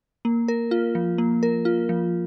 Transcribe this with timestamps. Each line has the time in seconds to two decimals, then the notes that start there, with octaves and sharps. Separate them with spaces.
0.25 A#3
0.48 A#4
0.71 F4
0.95 F3
1.18 A#3
1.43 A#4
1.65 F4
1.89 F3